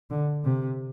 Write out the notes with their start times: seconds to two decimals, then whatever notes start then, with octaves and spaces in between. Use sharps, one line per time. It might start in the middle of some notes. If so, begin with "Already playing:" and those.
0.10 D3
0.44 C3